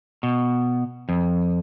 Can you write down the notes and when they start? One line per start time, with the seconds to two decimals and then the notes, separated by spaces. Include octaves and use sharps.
0.23 B2
1.09 F2